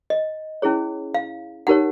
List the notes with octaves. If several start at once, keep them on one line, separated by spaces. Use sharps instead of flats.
D#5
C#4 E4 G#4 C#5
F5
D#4 G4 A#4 C#5 F#5